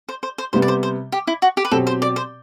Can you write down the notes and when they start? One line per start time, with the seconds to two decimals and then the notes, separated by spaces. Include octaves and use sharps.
0.09 C5
0.23 C5
0.38 C5
0.53 C3 G3 B3 C5
0.62 D5
0.68 C5
0.83 C5
1.12 G4
1.27 E4
1.42 F#4
1.57 G4
1.65 B4
1.71 B2 F#3 C4 G4 A4
1.87 C5
2.02 D5
2.16 C5